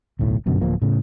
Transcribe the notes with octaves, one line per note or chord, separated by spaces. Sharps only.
D1 B1 A2
G1 F#2 B2 D3
D1 F3 A#3
A2 C#3